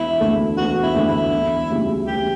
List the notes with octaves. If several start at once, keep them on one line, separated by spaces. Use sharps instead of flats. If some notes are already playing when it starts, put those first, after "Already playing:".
Already playing: E1 E4
D2 D3 A3
E1 F#4
E4
D2 D3 A3
E4
E1
D2 C#3 G3
E1 G4